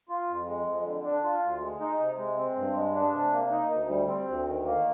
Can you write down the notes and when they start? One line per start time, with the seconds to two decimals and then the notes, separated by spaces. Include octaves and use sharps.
0.09 F4
0.27 F2
0.47 G#3
0.66 F2
0.84 D3
1.04 D4
1.23 F4
1.42 D2
1.61 G#3
1.80 D#4
1.99 C3
2.17 G#3
2.37 C4
2.56 G2
2.75 G#3
2.94 D4
3.13 C3
3.32 A#3
3.51 D#4
3.70 D2
3.89 G3
4.08 C4
4.27 D2
4.46 D#3
4.65 A#3